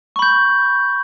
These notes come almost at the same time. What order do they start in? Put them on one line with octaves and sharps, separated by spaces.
C#6 B5 G6